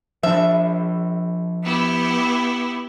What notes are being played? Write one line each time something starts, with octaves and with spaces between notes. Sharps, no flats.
F3 D4 E5
B3 E4 G4